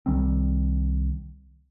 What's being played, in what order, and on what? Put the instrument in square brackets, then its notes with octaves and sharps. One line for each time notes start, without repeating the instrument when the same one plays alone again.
[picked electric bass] C2 D#3 G3 C4